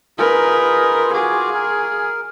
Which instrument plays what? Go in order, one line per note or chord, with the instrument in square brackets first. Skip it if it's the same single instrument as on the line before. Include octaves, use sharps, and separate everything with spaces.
[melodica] D#4 F4 G#4 [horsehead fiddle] A#4 B4
[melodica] F4 F#4 D6 [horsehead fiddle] G#4
[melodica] A#4